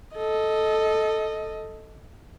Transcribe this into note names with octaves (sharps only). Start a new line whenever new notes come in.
A4 D#5